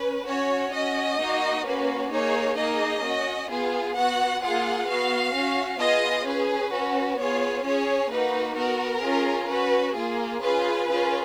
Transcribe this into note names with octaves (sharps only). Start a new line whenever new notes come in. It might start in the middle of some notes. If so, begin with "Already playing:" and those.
Already playing: C#4 B4
C#4 F#4 C#5
C#4 F#4 D#5
A#3 D#4 F#4
A#3 C#4 F#4 B4
A#3 D#4 G#4 C#5
A#3 D#4 G#4 D#5
C#4 F#4
B3 F4 G#4
B3 F#4 F#5
A#3 F4 G#4 F#5
B3 F#4 F5
C#4 F#4
B3 F4 G#4 D#5
C#4 G#4 B4
C#4 F#4
B3 F4 G#4 C#5
C#4 G#4 C#5
A#3 D#4 F#4 B4
B3 F#4 A#4
C#4 F4 G#4
C#4 F#4 B4
A#3 F4 G#4
C#4 F4 G#4 B4
C#4 F4 G#4